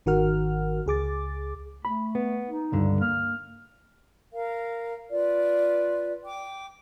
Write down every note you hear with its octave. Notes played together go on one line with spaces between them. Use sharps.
G#1 D#3 F#4 A#4 F#5 F6
C#2 G#4 D6 A6
A3 B5
B3
D#4
C#2 G2 D3
A#3 F6
A#4 F5
F4 B4 D5
G5 D6